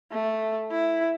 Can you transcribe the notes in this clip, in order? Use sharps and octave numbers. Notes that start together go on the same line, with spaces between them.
A3
E4